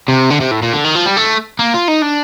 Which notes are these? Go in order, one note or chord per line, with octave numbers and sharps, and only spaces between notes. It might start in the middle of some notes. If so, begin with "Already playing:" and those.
C3
D3
C3
A2
A#2
D3
D#3
F3
G3
A3
A#3
F4
D#4
D4